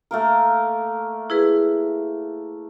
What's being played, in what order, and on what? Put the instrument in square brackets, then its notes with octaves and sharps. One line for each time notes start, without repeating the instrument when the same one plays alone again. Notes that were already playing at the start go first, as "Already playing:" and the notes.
[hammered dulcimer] A3 A#3 A#4
[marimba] E4 G#4 B4